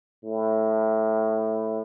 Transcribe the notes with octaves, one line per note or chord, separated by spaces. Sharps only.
A2